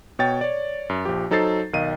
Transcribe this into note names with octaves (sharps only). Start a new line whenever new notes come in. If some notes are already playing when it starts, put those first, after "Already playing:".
B2 C#5 G5 A6
C#5 D5
F#2
A#1 F3 G4
F#3 D#4 A4 C5 A6 C7
B1 D#3 D#5 F5 D#7